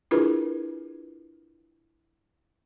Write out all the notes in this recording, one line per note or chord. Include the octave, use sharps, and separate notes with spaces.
D4 E4 F4 G#4 A#4 B4